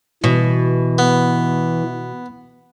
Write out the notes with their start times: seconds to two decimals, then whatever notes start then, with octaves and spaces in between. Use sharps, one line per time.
0.24 B2 E3
0.98 B3